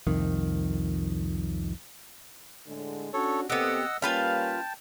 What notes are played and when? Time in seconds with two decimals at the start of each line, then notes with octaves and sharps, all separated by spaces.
0.07 C2 F2 D#3
2.67 A2 D3 G#3
3.13 C#4 D4 F#4 A4 C#5
3.50 A#2 B3 C4 G4 A4 D#5 F#5 E6
4.02 G3 A#3 C#4 F4 B4 F5 G5 A5